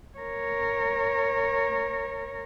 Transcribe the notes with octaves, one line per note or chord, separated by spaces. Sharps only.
A#4 C#5